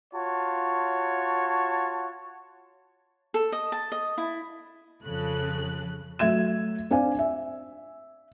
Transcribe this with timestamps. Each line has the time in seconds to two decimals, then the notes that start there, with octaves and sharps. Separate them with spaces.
0.13 F4 F#4 C#5 A5
3.34 A4
3.52 D#5
3.72 A5
3.92 D#5
4.18 E4
5.03 F2 C#3 F3 A4 F#6
6.19 F#3 A3 E5 G#6 E7
6.91 C4 D4 D5 F5 G#5
7.19 E5